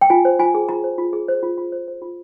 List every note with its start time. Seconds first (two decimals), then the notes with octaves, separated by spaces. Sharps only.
0.01 G5
0.10 F4 G#5
0.25 C5
0.39 F4 G#5
0.55 G#4
0.69 F4 A#5
0.84 C5
0.98 F4
1.13 G#4
1.28 C5
1.43 F4
1.58 F4
1.72 C5
1.88 C5
2.02 F4